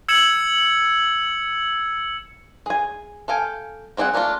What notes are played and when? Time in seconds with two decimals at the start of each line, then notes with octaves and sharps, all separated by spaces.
0.09 E6 G#6 C#7 E7 F#7
2.66 G#4 G#5
3.28 A4 F5 G5 G#5
3.97 G3 C4 D4 G#4 F#5
4.14 A3 A#3 D4 D#4 F4